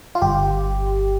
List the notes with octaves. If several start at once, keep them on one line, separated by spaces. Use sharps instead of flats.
F4
G1 G4